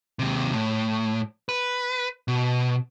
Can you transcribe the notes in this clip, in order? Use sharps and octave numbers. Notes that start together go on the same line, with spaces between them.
D#2 C3
A2
B4
B2